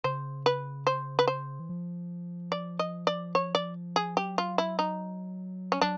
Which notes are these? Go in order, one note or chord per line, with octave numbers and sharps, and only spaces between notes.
C#3 C5
B4
C5
B4
C5
E3
F3
D5
D#5
D5
C#5
D5
G#4
F#3 G4
F4
E4
D#4
C#4
F#3 D4